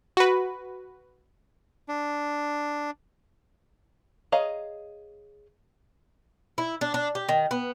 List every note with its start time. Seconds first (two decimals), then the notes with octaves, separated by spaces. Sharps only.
0.17 F#4 B4
1.89 D4
4.32 G#4 C#5 D#5 F5 A#5
6.58 E4
6.81 D4
6.94 D4
7.15 G4
7.29 D#3
7.51 B3